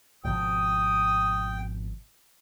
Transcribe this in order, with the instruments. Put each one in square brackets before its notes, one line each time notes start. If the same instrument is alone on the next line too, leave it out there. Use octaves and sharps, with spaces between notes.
[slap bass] G#1 B2 F3 [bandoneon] G5 [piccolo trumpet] D#6